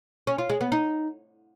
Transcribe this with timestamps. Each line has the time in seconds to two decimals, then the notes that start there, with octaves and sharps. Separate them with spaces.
0.27 C#4
0.38 F4
0.50 G#3
0.61 B3
0.72 D#4